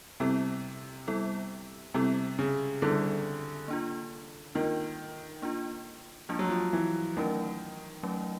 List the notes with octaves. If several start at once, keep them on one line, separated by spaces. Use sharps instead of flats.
C3 G3 B3 E4 A4
G3 B3 E4 A4
C3 G3 B3 E4 A4
C#3
D3 G3 B3 E4 A4
A#3 D4 F4
D#3 A#3 D4 F4
A#3 D4 F4
F3 A#3 D4 F4
F#3
F3
E3
D#3 F#3 A3 C#4
F#3 A3 C#4